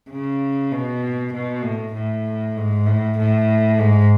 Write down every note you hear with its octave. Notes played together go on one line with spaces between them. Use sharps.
C#3
B2
B2
A2
A2
G#2
A2
A2
G#2